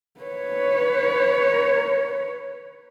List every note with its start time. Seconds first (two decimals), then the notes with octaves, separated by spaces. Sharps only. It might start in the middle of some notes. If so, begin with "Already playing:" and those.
0.21 B4 C#5